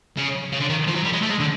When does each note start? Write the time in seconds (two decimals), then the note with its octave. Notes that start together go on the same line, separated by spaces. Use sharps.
0.18 C#3
0.52 C#3
0.60 D3
0.69 D#3
0.87 F3
0.96 F#3
1.05 G3
1.13 G#3
1.22 A3
1.30 G#3
1.40 D3